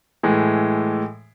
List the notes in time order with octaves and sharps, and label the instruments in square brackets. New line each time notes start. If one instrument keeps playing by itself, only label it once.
[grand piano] A2 E3 G#3